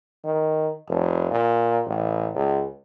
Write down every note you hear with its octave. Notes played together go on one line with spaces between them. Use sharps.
D#3
F1
A#2
A1
C#2